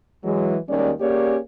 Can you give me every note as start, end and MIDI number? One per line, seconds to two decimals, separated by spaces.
0.24 0.57 52
0.24 0.57 54
0.24 0.57 56
0.68 0.91 39
0.68 0.91 51
0.68 0.91 55
0.68 0.91 56
0.68 0.91 61
0.68 0.91 74
1.01 1.37 58
1.01 1.37 61
1.01 1.37 67
1.01 1.37 68
1.01 1.37 73
1.01 1.37 74